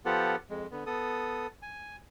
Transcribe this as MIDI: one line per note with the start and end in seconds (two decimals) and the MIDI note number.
0.05 0.36 53
0.05 0.36 59
0.05 0.36 65
0.05 0.36 67
0.05 0.36 69
0.05 0.36 78
0.50 0.67 41
0.50 0.67 56
0.71 0.84 50
0.71 0.84 59
0.86 1.47 59
0.86 1.47 69
0.86 1.47 87
1.62 1.96 80